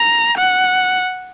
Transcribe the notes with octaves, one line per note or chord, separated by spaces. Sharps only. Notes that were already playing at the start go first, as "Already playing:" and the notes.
Already playing: A#5
F#5